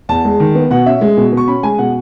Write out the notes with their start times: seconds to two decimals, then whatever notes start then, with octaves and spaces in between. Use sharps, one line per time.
0.09 E2 A5
0.25 G#3
0.40 D#3
0.55 B3
0.71 B2 F#5
0.86 C#4 E5
1.01 G#3
1.17 B2
1.32 B2
1.37 C#6
1.48 C#4 B5
1.63 G#3 G#5
1.79 B2 F#5